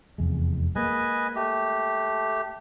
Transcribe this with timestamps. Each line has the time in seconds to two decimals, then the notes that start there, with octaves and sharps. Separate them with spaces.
0.18 F1 E2 G#3
0.76 G#3 A#3 B4 D#5 G#5
1.36 A3 G4